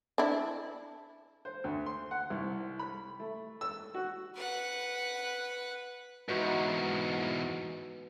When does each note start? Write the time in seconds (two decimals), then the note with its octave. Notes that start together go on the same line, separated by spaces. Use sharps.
0.18 D4 E4
1.45 C5
1.64 D2
1.86 C6
2.11 F#5
2.30 C2
2.79 B5
3.20 A3
3.61 E6
3.94 F#4
4.36 B4 F#5
6.29 E2 G#2 D#4 F#4 B4